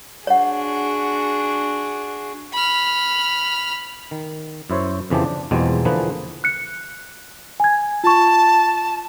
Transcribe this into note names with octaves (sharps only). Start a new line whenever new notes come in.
D4 F#4 G#4 C#5 F#5
B5 F6
D#3
F#2 E4 C5 C#5
F2 C#3 E3 F3 G4 A5
D4
E2 B2 F3 G3 G#3 C4
D3 E3 F3 A#3 G#4 B4
F#6 C#7
G#5 G#6
F4 A5 C#6